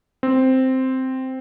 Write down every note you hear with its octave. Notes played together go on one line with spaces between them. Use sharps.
C4